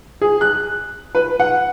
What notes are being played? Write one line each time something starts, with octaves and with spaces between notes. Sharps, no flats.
G#4
F#6
B4
F#5